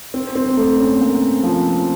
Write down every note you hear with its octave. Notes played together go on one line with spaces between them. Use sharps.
C4
C4
A3
C#4
A#3
F3